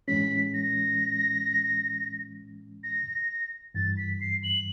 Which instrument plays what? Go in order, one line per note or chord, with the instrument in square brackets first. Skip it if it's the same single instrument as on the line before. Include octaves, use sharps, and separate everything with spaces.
[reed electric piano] A2 E3 G#3 C#4 [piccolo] B6
[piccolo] A#6
A#6
[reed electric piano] G2 E3 G3 [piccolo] A6
[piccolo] B6
C7
F#7